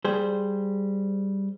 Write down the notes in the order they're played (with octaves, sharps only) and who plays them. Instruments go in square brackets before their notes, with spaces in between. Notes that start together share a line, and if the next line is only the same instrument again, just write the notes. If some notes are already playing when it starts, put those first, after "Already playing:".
[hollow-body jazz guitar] G3 G#4 C5